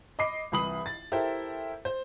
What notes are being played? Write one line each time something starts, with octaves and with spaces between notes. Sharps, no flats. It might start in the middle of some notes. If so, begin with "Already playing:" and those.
D#5 B5 D6 C7
C2 E3 B5 D#6 F#7
A6
E4 G4 A4 A#4 C5
C5